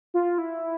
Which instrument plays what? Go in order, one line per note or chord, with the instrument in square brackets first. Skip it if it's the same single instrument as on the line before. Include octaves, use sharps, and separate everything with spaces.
[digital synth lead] F4
E4